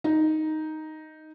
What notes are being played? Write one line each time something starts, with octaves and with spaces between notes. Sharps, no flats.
D#4